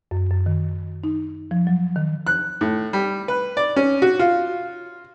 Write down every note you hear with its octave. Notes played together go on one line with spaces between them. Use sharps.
F#2
F#2
D#3
D#4
F3
F#3
D#3
F#6
A2
G3
B4
D5
C#4
F#4
F4